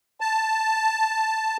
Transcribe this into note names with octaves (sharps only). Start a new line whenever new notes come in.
A5